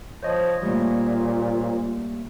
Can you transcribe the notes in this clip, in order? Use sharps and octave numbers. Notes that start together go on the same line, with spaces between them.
F3 C5 C#5 D#5
A#2 G3 A3 A#3